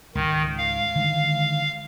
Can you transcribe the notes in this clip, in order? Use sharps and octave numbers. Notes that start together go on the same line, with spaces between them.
C#2 G#2 D#3
F5
D3 D#3 G#3